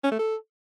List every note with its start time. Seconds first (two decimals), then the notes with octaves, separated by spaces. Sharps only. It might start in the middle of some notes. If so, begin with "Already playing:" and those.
0.04 C#4
0.11 A3
0.19 A4